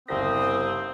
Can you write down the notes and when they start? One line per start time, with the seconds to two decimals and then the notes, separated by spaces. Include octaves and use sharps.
0.08 G1 C2 C#3 C4 D#6 A#6